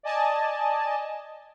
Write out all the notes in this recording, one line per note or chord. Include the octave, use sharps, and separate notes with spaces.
D5 D#5 G#5 A5